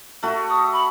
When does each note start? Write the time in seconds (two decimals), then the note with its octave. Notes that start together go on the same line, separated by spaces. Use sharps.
0.23 A3 F#4
0.50 D#6
0.73 B5